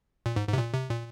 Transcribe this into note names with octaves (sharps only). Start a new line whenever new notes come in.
A#2
G#2
G#2
C3
A#2
C3
A#2